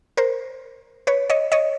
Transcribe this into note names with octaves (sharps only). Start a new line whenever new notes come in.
A#4 C5
B4 C#5
C#5 D#5
C#5 D#5